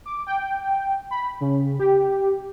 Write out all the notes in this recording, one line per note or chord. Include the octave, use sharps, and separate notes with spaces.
D6
G5
B5
C#3
G4